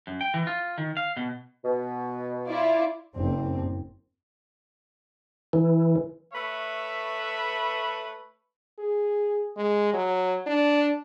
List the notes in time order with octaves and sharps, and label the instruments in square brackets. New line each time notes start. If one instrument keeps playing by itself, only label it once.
[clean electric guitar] F#2
G5
E3
F4
D#3
F5
B2
[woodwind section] B2
[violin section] E4 F4 D5
[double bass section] F#1 C4
[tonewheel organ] E3
[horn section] A3 B4 C#5 E5 B5
[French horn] G#4
G#3
F#3
D4